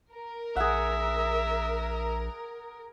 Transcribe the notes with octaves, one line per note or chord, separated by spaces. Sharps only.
A#4
A#1 G#4 E5 F#5